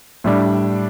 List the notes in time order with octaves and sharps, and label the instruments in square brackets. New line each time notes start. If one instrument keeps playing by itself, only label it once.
[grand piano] A2 G3 D4